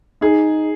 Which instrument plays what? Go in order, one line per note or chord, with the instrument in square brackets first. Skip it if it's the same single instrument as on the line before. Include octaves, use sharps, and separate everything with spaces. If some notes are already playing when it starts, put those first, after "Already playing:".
[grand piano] D#4 [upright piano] G#4